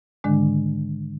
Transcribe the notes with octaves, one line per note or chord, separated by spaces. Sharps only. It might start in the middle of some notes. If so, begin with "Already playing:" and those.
G#2 D3 D#3 G#3 D4